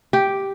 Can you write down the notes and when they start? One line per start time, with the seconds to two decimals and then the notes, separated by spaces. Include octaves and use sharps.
0.13 G4